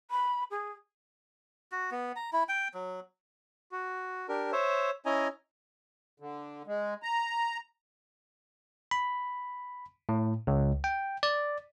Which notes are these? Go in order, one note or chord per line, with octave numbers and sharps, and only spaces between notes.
B5
G#4
F#4
B3
A#5
E4
G5
F#3
F#4
D4 G4 A#4
C5 C#5 E5
C#4 E4 D#5 G#5 A#5
D3
G#3
A#5
B5
A2
C#2
G5
D5